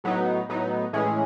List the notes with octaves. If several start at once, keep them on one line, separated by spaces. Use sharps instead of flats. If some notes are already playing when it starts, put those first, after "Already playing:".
A2 F#3 B3 D#4
A2 F#3 B3 D#4
A2 E3 G#3 C#4 G#4